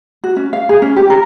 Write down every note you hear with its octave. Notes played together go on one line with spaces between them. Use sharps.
F#4
C#4
F5
G#4
C#4
G4
A#4